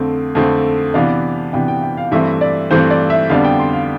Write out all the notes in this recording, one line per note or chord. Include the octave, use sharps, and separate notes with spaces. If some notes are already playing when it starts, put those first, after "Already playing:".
Already playing: F2 D3 A3 C4
F2 D3 A3 C4
C3 E3 B3 D4 F5
C3 E3 B3 D4 G5
G5
G5
F5
G2 E3 A3 C4 E5
D5
G2 E3 A3 C4 C5
D5
E5
F2 D3 G3 B3 D4 F5
G5
C6
F5